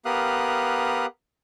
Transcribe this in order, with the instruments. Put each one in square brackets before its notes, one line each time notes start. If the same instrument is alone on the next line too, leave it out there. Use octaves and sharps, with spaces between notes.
[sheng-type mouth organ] B3 G4 A#4 F5 D#6 F#6